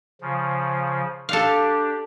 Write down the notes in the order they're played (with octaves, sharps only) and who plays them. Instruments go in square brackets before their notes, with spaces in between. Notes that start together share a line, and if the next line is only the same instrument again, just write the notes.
[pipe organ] C#3 F3
[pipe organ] D4 G4 [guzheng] A4 F5